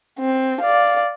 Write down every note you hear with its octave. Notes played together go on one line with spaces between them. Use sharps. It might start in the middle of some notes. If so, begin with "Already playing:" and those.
C4
D5 F5